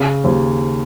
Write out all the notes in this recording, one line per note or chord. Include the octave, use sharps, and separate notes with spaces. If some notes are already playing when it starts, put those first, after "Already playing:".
Already playing: C#3
D#2